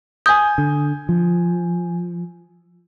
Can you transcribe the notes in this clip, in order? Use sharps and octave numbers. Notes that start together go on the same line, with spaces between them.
G#5 D#6 G6
D3
F3